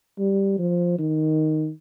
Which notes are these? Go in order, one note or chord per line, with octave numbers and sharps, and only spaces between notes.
G3
F3
D#3